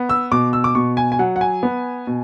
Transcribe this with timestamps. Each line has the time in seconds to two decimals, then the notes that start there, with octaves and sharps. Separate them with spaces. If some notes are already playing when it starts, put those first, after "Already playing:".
Already playing: B3
0.09 E6
0.31 B2 D6
0.53 E6
0.64 D6
0.75 B2 C#6
0.97 G#5
1.12 G#5
1.19 F#3 F#5
1.36 F#5
1.41 G#5
1.63 B3
2.07 B2